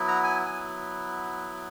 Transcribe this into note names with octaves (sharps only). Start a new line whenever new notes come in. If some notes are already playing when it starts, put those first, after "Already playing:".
Already playing: F#3 B3 E4
A#5
G#5
G#5